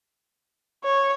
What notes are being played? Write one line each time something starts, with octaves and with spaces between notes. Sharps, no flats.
C#5